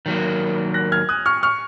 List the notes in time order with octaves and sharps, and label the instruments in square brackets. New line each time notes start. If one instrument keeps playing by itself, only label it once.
[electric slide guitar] D#3 F#3 A#3
[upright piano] F#6 A#6
F6 G#6
D#6 F#6
C#6 F6
C#6 F6